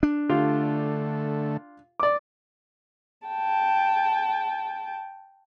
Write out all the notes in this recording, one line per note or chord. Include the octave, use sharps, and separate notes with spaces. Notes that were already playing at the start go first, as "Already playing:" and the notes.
D4
D3 A3 F4 G4
D5 D6
G5 A5